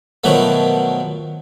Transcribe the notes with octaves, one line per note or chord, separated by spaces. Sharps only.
B2 D#3 F3 F#3 A3 B3